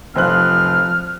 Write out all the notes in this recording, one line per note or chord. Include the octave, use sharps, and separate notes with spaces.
F1 F3 C5 F6 F#6